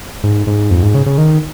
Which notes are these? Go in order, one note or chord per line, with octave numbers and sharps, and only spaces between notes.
G#2
G#2
F2
G#2
C#3
C#3
D#3